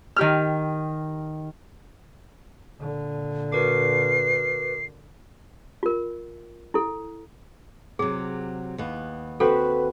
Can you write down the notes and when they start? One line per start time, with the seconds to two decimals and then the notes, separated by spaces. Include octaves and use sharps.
0.16 D#3 G4 F6
2.78 A#2 D3
3.52 F#4 A#4 B4 D6 C7
5.83 F4 A#4
6.74 E4 A4
7.99 C3 F#3 G#4
8.78 D#2 B3
9.40 C4 F#4 A4 B4 B5